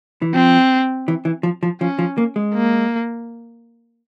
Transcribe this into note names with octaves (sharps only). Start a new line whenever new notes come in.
E3
F3 C4
E3
E3
F3
F3
F3 C#4
F3
A#3
G#3
A#3